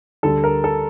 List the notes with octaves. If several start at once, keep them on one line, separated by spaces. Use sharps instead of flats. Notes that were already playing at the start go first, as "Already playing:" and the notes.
D2 D3 G3 A4
A#4
A4